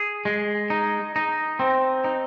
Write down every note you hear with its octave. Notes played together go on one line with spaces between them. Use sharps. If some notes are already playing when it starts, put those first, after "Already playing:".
Already playing: G#4
G#3
D#4
D#4
C4
D#4